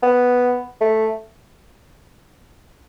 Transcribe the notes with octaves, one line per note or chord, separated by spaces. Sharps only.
B3
A3